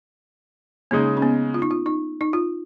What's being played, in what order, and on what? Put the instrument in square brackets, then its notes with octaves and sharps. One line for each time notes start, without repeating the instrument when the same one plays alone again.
[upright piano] C#3 G#3 D#4 [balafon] A#3
[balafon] C#4
B3
F4
D#4
F4
D#4
D#4
F4